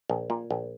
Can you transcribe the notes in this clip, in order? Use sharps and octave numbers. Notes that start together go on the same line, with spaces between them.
A#1
A#2
A#1